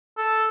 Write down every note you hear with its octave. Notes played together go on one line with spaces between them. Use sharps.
A4